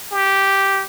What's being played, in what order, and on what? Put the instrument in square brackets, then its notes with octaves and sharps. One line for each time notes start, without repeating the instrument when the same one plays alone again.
[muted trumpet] G4